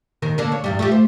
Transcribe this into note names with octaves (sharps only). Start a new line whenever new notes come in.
D#2 D#3 A#4
D3 A#3 D4
C#5
E2 G2 G3
A3 F4 G4
C5